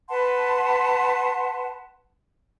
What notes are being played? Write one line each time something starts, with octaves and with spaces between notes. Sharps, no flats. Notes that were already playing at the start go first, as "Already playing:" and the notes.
B4 F#5 A5 C6